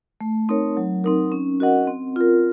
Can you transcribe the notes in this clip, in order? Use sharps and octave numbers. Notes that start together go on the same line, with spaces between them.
A3
C4 D#4 A#4 C#5
F#3
C4 D#4 A#4
C#4
F#4 A#4 D#5 F#5
C4
F4 A#4